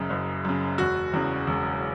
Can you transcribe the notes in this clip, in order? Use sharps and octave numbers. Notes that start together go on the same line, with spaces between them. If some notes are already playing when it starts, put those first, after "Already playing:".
Already playing: F#1 F#2 C#3
F#1
F#2 C#3
E1 F#4
E2 C#3
E1